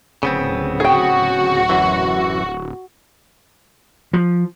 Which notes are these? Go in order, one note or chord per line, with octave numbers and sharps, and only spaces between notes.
D1 C#3 B3 C4
F#4 G#4 G5
F#2 E3
F3